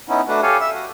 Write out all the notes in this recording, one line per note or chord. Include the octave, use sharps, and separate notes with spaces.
B3 C#4 D#4 E4
A3 D4 F#4 B4
G4 A4 C#5 F5 G#5
E5 E6
F#4